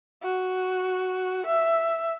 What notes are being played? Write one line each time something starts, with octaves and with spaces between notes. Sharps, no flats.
F#4
E5